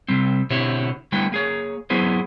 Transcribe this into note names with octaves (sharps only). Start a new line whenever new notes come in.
C3 G3 C4
B2 D3 C4 E4 G4 C#5
D3 G3 A3 B3 E4 G5
A#3 G#4 C#5
F#3 B3 E4 G#4 C5